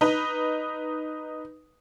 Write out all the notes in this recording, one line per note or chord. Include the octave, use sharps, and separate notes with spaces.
D#4 B4